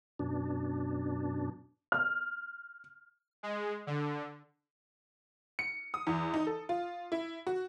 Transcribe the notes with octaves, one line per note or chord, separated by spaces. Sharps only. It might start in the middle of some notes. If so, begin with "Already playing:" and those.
F#2 B2 D4
F6
G#3
D3
C#7
D#6
E2
D#4
A4
F4
E4
F#4